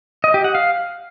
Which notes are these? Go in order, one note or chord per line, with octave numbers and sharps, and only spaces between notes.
D#5
G4
F#5
F5